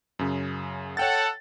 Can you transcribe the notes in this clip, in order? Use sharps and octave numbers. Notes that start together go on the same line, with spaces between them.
F#2 C#3
A4 C#5 F#5 G5 A6